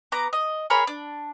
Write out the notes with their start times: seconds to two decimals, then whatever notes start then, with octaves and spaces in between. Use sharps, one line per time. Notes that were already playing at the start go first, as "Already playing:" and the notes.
0.12 B3 A#5 D6
0.33 D#5
0.70 G#4 A#4 C#5 B5
0.87 D4